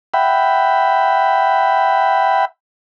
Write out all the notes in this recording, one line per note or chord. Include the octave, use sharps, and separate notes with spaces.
E5 F#5 G5 B5